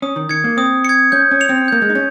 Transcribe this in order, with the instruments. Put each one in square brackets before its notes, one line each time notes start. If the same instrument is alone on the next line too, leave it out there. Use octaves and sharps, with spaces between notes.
[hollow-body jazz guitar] C#4 [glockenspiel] D#6
[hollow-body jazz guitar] D#3
[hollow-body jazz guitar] D#3 [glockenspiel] G#6 C#7
[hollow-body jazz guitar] A#3
[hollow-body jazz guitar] C4 [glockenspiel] D#6
[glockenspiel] G#6 C#7
[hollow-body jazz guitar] C#4 [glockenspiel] G6
[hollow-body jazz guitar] C#4
[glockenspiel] C#7 F7
[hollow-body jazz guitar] C4
[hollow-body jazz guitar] A#3 [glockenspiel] G6
[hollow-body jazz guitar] G#3
D#4
C#4